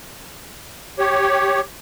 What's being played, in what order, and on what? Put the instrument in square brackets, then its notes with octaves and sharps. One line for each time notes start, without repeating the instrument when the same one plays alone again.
[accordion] G4 C#5